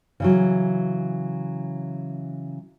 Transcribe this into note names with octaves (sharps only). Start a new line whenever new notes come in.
C#3 E3 F#3